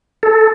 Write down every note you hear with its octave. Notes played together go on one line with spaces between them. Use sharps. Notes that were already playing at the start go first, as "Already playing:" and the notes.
A4